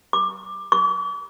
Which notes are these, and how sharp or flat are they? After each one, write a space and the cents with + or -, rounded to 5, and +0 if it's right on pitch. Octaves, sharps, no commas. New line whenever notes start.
D6 +15
D6 -40